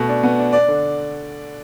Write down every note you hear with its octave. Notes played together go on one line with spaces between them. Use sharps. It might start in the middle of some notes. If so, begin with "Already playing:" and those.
Already playing: B2 A3
D4
B3
D4
D4 D5
D3